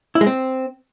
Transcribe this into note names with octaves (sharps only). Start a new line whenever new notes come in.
E4
G#3
C4